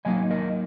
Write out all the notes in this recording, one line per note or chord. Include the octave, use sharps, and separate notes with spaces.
F#3 A#3 D#4 D#5 G#5
A#4 D#5